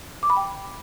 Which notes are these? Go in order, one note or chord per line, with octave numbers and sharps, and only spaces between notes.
D6
B5
G5